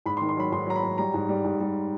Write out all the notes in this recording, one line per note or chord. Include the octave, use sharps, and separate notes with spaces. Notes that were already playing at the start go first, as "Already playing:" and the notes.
G#2 B5
C6
D#3
C6
F#3 B5
G#2 C6
F#3 A#5
B5
F#3
G3 A#5
G#2
G3
G#2
G3